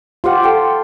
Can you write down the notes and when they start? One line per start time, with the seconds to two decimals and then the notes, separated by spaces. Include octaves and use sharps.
0.24 F4 G4 C5 F5 F#5
0.43 A4 G5